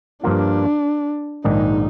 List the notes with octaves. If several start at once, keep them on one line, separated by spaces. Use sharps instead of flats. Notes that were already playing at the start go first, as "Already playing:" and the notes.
G2 F3 A#3 D4 F4
A#1 G#2 D#3 G#3 D4 D#4